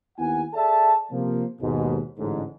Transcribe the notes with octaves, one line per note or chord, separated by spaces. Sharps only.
D#2 B3 E4 F#5 G#5
G#4 A4 D5 E5 A5
C3 F3 A#3
D#2 G#2 B2
A1 G#2 D3